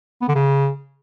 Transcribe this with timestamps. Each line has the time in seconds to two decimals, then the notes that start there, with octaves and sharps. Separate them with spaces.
0.22 B3
0.28 D3
0.35 C#3